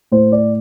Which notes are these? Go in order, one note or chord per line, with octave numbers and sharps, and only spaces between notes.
A2 C5
D5